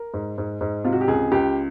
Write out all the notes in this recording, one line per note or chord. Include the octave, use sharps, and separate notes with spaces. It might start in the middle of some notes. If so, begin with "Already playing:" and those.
Already playing: A#4
G#2
G#2
G#2
C3 F4
F#4
G4
C#2 G#4
C#2 G4